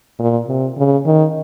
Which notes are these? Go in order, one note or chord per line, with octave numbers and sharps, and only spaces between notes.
A#2
C3
C#3
D#3